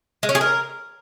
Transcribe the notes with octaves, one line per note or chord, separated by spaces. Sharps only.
G#3
C#4
G#4
A#4